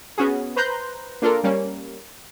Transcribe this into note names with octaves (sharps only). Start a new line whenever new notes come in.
B3 C#4 F#4 G#4
B4 C5 A#5 C6 F#6 G6
A#3 D4 F4 A4 A#4
G3 A#3 C#4